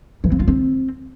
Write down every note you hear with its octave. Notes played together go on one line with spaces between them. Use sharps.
E3
C4
F4
C4